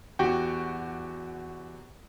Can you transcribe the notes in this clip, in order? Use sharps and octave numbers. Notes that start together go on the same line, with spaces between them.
E2 F#4 G4 G5